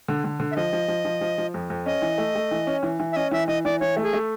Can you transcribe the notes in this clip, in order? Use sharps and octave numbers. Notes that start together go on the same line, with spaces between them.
D3
D3
D3
E5
F3 D#5
F3
F3
F3
F3
F3
F2
F2
C#4 D#5
E3
A3
A3
E3
C#4
E3
E3
E5
C#4 D#5
E3 E5
E3 D#5
E3 D5
E3 C#5
A3
G#4
A3